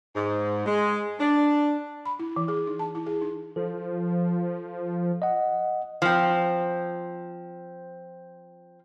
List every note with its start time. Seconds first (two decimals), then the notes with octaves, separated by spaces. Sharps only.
0.15 G#2
0.66 G#3
1.19 D4
2.06 B5
2.19 E4
2.36 E3
2.48 G#4
2.67 D#4
2.79 A5
2.95 E4
3.07 G#4
3.21 D#4
3.56 F3 A4
5.22 D#5 F#5
6.02 F3 C4